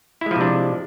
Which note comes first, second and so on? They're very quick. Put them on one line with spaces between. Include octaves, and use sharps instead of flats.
E4 G#3 F3 C3 D4